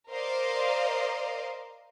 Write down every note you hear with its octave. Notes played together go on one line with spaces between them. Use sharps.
A#4 C5 D5 D#5 F5